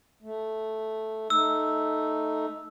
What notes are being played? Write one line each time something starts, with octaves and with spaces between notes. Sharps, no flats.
A3
A3 D#4 E6